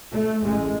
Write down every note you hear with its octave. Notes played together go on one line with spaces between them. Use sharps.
A3
A1 A2 G#3